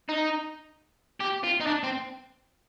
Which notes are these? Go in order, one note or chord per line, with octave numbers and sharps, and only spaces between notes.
D#4
G4
F4
D#4
D4
C4